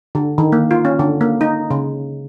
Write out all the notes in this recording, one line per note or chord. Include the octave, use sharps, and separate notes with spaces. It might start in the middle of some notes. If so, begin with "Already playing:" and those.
D3
D#3
A#3
F4
C#4
D3
A#3
D#4
C#3